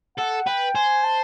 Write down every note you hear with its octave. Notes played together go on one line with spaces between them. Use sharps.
A4 F#5
B4 G5
C5 G#5
A5